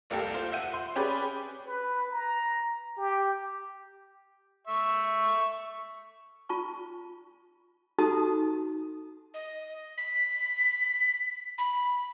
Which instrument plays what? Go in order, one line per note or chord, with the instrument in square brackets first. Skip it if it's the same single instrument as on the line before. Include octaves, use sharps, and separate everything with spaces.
[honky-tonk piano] F1 C2 A#3 G4 A4
F4 C5
E5 F#5 G6 D#7
C6
C#4 G4 G#4 B4 D5
[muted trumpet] B4
A#5
G4
[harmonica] E5 C#6
[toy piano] F4 A5 C#6
D#4 F#4 G4 A4 A5 D#6
[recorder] D#5
B6
B5